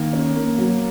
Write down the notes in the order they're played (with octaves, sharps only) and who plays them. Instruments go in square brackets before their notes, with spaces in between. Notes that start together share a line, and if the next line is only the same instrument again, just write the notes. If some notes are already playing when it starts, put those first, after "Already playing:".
Already playing: [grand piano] D#3 [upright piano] A#3
[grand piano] C#4
A#3
F#3